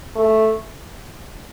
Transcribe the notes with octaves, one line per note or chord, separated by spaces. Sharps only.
A3